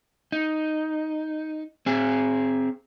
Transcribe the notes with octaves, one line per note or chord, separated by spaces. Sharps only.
D#4
C4 G#4